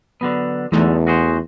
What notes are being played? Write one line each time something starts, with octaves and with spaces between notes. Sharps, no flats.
D3 F#3 B3
E2 D3 E3 F#3 G#3 A3 D#4
F#4 G#4 C5